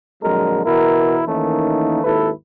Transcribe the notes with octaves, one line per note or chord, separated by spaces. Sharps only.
A#1 F2 D3 F#3 G#3 A#4
E2 B2 E4 A#4
D#3 E3 A3 A#3 C#4 D#4
G#1 D#2 E4 A4 B4